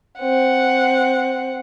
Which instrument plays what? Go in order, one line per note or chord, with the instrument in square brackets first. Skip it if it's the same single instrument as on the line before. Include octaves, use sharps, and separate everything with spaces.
[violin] C4 F#5